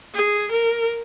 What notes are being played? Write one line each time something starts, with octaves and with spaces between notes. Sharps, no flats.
G#4
A#4